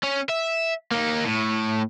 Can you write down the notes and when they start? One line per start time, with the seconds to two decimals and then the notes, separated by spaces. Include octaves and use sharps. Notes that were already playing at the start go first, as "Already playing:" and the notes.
0.03 C#4
0.29 E5
0.91 A#3 D#4
1.25 A2